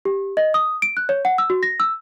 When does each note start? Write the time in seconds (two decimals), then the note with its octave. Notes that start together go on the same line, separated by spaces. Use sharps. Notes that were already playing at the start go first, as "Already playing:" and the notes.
0.05 G4
0.37 D#5
0.54 D#6
0.82 D7
0.97 F#6
1.09 C#5
1.25 F#5
1.38 E6
1.50 F#4
1.63 A#6
1.80 E6